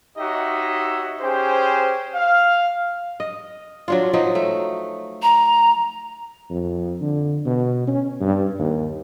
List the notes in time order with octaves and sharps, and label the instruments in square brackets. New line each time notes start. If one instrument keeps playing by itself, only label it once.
[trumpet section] D#4 F#4 G4 C#5 D#5 E5
C#4 G4 G#4 C5
F5
[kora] D#5
F#3 D4 F4
F3 F#3 D#4
A3
[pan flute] A#5
[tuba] F2
D3
B2
C#4
G2
D#2